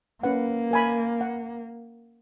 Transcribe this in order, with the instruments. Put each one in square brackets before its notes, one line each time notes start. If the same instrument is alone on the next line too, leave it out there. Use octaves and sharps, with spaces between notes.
[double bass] A#3 [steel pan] C#4 B4 F#5
[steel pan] A#4 G#5 B5
F#5